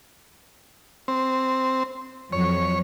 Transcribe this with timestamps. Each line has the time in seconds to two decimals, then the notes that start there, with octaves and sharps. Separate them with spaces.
1.08 C4
2.33 F2 F#3 C#5